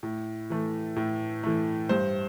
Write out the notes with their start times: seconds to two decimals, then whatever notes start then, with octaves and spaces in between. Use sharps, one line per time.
0.03 A2
0.50 E3 A3
0.96 A2
1.43 E3 A3
1.89 G2 C5